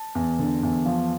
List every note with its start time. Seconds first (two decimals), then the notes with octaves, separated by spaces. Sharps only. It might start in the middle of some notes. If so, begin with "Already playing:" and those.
Already playing: A5
0.15 E2
0.39 D3
0.63 E2
0.85 F3